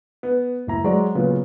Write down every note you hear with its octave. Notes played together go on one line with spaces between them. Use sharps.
B3
F#1 E4 A#5
F#3 G#3 F#4 C5 D5 A#5
A#2 C#3 F#3 B3 F4